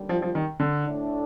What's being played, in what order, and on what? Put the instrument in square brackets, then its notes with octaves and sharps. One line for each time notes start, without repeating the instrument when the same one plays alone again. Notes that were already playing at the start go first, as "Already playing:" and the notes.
Already playing: [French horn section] D#2 D3 G3
[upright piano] F3
F3
D#3
D3
[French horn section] A2 A3 D4